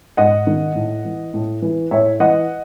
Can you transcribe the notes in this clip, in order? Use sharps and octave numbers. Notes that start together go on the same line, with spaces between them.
G#2 D#5 F#5
D#3
A2
E3
A2
E3
A2 C#5 E5
E3 D#5 F#5